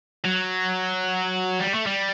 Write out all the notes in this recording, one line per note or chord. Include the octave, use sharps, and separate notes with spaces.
F#3
G3
A3
G3